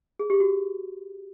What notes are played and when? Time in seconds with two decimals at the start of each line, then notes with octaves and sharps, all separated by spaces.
0.19 G#4
0.30 G4
0.40 F#4